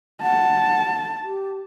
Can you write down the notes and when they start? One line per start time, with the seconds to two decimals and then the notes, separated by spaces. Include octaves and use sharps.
0.22 F#5 A5
1.23 G4